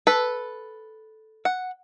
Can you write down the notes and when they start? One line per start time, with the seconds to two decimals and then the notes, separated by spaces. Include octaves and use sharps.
0.07 A4 B4
1.45 F#5